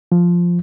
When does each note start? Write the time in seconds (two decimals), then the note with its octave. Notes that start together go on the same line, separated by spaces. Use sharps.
0.12 F3